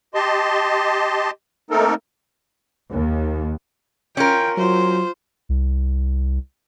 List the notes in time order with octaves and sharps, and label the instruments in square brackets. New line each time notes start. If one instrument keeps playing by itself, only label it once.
[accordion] G4 D#5 A5 C6
A3 A#3 C4 D#4 A4 A#4
[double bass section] D#2
[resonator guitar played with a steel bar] C#4 A#4 [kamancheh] F4 [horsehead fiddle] G5
[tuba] F#3 [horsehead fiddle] F4 [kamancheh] C5
[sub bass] C2